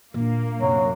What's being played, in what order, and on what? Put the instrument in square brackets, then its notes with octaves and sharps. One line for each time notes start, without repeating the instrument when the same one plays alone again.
[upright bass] A#2 D4 [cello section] A#3
[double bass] F#2 C3 [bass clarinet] F#3